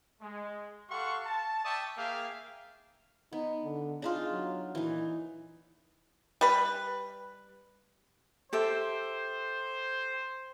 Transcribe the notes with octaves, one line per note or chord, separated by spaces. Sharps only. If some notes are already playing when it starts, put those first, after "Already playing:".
G#3
G4 A4 F5 F#5 C6 C#6
A5
D5 E5 G5 A5 C#6 D#6
A#3 G#4 E5 F5 G5
B3 D#4
D3
D4 D#4 F4 G#4
F#3
A#2 E3 D#4
G3 B4
G4 A4 C5 E5